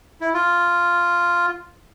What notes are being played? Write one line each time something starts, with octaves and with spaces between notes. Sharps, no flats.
E4
F4